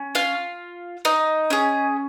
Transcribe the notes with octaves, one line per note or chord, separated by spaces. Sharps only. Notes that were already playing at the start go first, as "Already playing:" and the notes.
Already playing: C#4
F4 F5
D#4 D#5
C#4 G#4